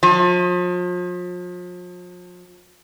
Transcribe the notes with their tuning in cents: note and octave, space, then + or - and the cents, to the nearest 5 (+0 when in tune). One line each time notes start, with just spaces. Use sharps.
F3 +40